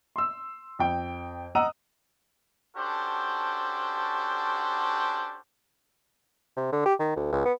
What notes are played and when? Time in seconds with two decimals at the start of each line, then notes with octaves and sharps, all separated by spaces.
0.16 C6 E6
0.79 F2 G5
1.55 D#5 F#5 A#5 D#6 E6 D#7
2.77 C#4 D4 F#4 G4 A4 C5
6.57 C3
6.73 D3
6.86 G4
7.00 D#3
7.16 D2
7.32 C#2
7.45 B3